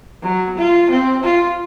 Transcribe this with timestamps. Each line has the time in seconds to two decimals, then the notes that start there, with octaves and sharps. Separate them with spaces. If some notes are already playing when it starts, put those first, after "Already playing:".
0.23 F#3
0.58 F4
0.90 C4
1.23 F4